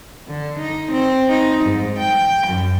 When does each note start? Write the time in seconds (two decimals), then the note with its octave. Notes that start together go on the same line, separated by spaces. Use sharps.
0.27 D3
0.58 D#4
0.92 C4
1.29 D#4
1.64 G#2
1.98 G5
2.47 F#2